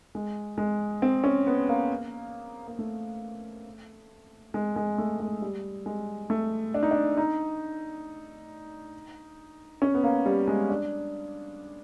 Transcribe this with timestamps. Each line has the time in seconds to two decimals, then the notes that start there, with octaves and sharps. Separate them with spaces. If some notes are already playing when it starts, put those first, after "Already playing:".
0.15 G#3
0.58 G#3
1.02 C4
1.24 C#4
1.47 B3
1.69 A#3
2.68 A#3
2.79 A3
4.54 G#3
4.76 G#3
4.98 A3
5.20 G#3
5.42 G3
5.86 G#3
6.30 A3
6.74 D4
6.83 D#4
6.91 D4
7.17 D#4
9.82 C#4
9.94 B3
10.04 A#3
10.26 G3
10.48 G#3
10.70 D4